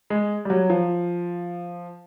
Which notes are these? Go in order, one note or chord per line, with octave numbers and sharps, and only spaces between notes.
G#3
G3
F#3
F3